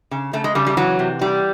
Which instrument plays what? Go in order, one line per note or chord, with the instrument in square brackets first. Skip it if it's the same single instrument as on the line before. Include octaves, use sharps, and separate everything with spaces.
[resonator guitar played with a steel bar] C#3
C#3 A3
G#3
C#3 G3
G3
E3 F#3
C3
E3 G3